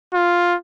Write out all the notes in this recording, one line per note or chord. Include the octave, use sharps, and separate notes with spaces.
F4